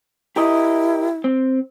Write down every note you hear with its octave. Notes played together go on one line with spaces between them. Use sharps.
E4 G4 A#4 D#5
C4